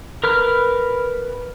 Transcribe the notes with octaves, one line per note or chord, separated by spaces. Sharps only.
A#4 B4 F6